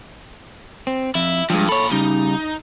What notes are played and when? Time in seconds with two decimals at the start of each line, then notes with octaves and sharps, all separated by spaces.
0.87 C4
1.15 F2 E4
1.50 G2 F3 G#3
1.69 A#2 A4 C#5 B5
1.92 C#3 G3 D#4